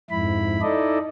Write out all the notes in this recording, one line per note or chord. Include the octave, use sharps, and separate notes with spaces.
F2 G#2 E4 B5
D#4 E4 A4 D5 D#5